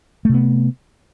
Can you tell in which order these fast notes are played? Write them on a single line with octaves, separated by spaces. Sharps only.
A3 C3 B3